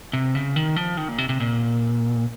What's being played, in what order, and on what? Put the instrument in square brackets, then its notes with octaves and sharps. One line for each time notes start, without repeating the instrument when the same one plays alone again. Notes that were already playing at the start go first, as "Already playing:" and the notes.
[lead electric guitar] C3
C#3
D#3
F3
D#3
A#2
C3
C3
A#2